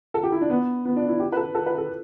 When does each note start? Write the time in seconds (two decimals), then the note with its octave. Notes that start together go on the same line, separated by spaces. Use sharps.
0.14 A4
0.23 G4
0.32 E4
0.41 D4
0.50 B3
0.85 B3
0.96 D4
1.08 E4
1.20 G4
1.32 B4
1.37 A4
1.55 A4
1.66 B4
1.78 A4